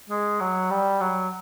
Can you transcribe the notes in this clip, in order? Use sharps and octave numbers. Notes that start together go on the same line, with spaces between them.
G#3
F#3
G3
F#3